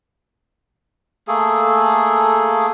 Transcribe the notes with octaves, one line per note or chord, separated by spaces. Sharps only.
A3 A#3 G#4 A4